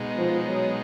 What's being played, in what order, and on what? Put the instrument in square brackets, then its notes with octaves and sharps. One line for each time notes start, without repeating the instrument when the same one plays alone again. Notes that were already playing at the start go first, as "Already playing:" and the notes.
Already playing: [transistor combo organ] B2 G#3 D#4
[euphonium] F3
F#3